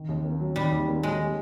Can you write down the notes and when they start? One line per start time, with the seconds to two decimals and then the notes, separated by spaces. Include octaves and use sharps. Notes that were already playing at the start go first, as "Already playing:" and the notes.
Already playing: D#3
0.09 D#2
0.25 A#3
0.40 F#3
0.56 D#3 G3
0.72 D#2
0.88 A#3
1.03 F#3 G#3
1.20 G3